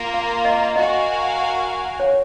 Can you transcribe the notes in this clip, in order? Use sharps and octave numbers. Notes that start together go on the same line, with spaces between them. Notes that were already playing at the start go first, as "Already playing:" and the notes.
Already playing: A#3 F4 A#4
F5
D#5
F#4 A#4 D#5 F5 G#5
C#5